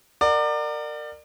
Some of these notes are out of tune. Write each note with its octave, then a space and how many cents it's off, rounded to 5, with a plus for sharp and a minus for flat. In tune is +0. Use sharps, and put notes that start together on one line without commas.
A#4 -15 D5 +30 F#5 +5